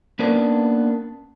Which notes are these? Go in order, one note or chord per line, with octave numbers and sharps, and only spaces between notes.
A#3 B3 C#4 D4 A#4 B4